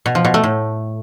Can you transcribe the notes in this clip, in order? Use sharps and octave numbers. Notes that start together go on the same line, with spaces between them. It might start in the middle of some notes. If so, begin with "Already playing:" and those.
B2
F3
B2
A3
A2